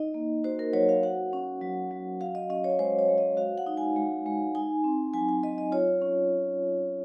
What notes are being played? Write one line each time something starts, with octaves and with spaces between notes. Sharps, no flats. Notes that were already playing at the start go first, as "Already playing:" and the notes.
Already playing: D#4 D#5
A#3
F#4 C5
A#4
F#3 C#5
F5
F#4 F#5
C#4
F#3
F#3
F#4 F5
D#5
C#4 D#5
C#5
G#3 C5
C#5
G#3
D#5
F#4 F5
F#5
D#4
G#5
G#3
G#3
D#4 G#5
C4
F#3 G#5
G#5
F#3 D#5
D#5
F4 C#5
C#4